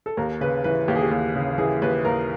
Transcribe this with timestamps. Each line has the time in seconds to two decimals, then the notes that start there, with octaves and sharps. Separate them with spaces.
0.06 A4
0.17 D#2 A#4
0.41 C#3 B4
0.64 E3 B4
0.88 D#2 G4
0.96 G#4
1.02 G4
1.11 D#2
1.36 C#3
1.58 E3 G#4
1.82 D#2 B4
2.05 D#2 A#4